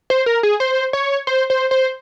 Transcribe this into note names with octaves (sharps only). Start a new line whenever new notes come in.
C5
A#4
G#4
C5
C#5
C5
C5
C5